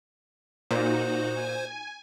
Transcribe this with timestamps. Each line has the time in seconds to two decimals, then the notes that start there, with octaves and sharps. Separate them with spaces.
0.71 A#2 D#4 F#4 C5
1.34 G#5